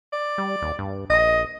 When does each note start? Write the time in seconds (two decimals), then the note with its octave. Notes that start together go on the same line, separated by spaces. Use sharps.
0.13 D5
0.38 G3
0.62 D#2
0.79 G2
1.10 A#1 D#5